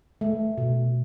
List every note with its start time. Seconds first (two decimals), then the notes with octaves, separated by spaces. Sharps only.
0.21 A3
0.58 B2